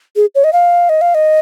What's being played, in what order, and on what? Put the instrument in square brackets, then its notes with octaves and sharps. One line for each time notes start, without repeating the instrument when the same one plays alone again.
[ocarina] G#4
C#5
D#5
F5
D#5
F5
D#5